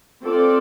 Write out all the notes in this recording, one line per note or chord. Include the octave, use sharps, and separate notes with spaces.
C4 F4 A4 D5